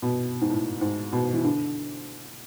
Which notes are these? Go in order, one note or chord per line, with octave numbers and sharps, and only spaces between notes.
B2
G#2
A2
G#2
B2
E3
D3